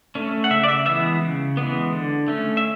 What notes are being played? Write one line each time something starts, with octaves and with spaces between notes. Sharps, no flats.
A3 C#4
F#5
C#3 E5
D5
E5
E3 G#3 B3 E5
C#3
E3 G#3 B3
D3
A3 C#4
E5